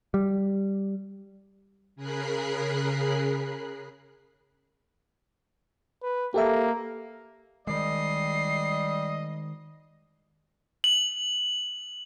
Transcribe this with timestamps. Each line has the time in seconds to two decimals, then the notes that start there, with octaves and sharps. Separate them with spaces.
0.14 G3
1.96 C#3 G#4 A#4 B5 F#6 C7
6.03 B4
6.34 A#3 G4 A4 E5
7.67 D#3 G3 G#3 D#5 C7
10.84 F#7